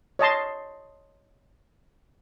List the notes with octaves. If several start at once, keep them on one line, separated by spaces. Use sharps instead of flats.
C#5 D#5 A5 C6